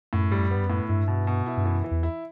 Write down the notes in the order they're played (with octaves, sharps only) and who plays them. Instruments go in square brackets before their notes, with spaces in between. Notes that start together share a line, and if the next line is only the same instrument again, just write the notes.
[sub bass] F#2 [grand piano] A2
[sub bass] G2 [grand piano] G3
[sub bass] F#2
[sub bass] G2 [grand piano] B3
[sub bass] F#2
[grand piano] A2
[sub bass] G2 [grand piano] E4
[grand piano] B2
B2
E4
[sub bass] G2
[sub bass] F#2 [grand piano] E3
[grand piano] E3
[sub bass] E2
[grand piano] E4